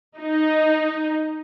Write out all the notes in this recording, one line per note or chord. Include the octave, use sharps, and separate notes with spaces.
D#4